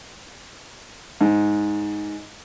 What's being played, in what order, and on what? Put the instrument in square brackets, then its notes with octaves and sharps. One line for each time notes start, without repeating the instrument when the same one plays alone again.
[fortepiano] G#2